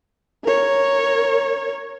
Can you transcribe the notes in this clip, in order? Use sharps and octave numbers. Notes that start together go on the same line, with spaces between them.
A#4 C#5